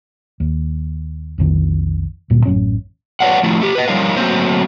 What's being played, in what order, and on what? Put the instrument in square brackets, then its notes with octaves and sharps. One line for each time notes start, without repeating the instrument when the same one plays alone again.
[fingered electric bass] D#2
B1 F2 D#3
D1 G2 A#2
A1 F#2 C#4
[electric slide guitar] B4 C#5 D5 F5 F#5
F3 A3 E4
A3 G4
B4 D#5
F3 G3 D#4 A#4 C#5 F5
F#3 A3 A#3 C4 C5 C#5